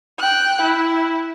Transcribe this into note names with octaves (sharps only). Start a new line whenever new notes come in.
G5 F#6
E4